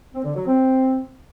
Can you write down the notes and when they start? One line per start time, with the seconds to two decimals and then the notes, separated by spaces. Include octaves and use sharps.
0.14 C4
0.24 D3
0.35 F#3
0.46 C4